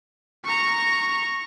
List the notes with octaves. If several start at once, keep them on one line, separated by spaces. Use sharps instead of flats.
A#5 C#6